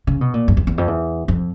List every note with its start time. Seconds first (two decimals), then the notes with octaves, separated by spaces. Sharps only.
0.07 C#3
0.21 B2
0.34 A#2
0.48 F#2
0.57 E2
0.67 E2
0.78 F2
0.88 E2
1.28 F2